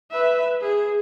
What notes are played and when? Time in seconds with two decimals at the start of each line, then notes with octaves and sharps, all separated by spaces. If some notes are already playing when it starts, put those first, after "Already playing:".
0.11 B4 E5
0.61 G#4